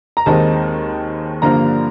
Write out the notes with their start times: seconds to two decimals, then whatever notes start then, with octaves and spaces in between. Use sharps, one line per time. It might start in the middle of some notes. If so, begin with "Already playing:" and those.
0.17 A#5
0.26 D#2 D#3 G#3 C4 D#4 A5
1.42 G2 D3 F3 A#3 A#5